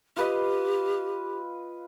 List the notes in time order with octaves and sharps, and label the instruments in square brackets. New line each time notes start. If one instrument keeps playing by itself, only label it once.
[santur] F4 B4 D#5 [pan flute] G4